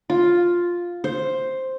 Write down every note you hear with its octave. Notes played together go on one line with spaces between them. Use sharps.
F4
C5